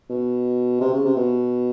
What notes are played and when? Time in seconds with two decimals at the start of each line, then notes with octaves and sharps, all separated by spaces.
0.10 B2
0.81 C3
0.93 C#3
1.05 C3
1.16 B2